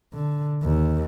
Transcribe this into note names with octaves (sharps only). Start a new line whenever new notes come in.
D3
D#2